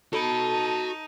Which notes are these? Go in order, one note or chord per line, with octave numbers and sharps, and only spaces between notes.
D#4 F#4 A4 B5